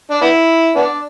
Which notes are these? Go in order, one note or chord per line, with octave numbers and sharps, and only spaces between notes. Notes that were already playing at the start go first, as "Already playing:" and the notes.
D4
B3 E4
B3 D4